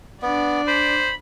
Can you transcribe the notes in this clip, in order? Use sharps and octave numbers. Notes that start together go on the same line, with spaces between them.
B3 D4 D5
C5 B5